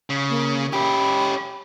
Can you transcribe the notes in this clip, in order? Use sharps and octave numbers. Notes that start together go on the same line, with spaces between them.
C#3
A#3
C#4 G4 B5